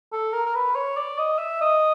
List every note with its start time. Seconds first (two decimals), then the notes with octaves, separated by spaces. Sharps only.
0.13 A4
0.33 A#4
0.46 A#4
0.55 B4
0.75 C#5
0.97 D5
1.18 D#5
1.39 E5
1.61 D#5